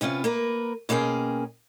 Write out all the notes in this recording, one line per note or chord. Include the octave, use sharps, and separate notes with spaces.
C3 B3 C#4 F4
A#3 A#4 B4
B2 A#3 C#4 G#4 G5